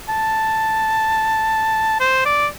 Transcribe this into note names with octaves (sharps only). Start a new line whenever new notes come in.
A5
C5
D5